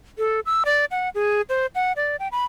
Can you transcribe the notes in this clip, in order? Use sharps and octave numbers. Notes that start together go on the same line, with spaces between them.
A4
E6
D5
F#5
G#4
C5
F#5
D5
G5
B5